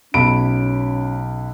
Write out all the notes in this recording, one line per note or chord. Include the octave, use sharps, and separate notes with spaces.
B1 C#4 B5 D7